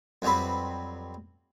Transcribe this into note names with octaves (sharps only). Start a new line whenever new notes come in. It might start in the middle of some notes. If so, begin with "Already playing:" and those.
F2 F#3 G3 C4 B4